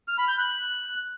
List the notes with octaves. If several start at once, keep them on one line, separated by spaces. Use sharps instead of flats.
F6
B5
G6
F#6